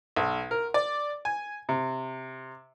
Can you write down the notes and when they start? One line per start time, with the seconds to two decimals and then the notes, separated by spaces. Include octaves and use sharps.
0.16 B1
0.51 A#4
0.74 D5
1.25 G#5
1.69 C3